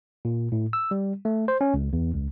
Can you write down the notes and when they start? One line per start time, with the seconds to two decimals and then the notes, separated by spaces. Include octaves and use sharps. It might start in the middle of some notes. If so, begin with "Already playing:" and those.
0.25 A#2
0.52 A2
0.73 E6
0.91 G3
1.25 A3
1.48 C5
1.61 C#4
1.74 C#2
1.93 E2
2.15 C#2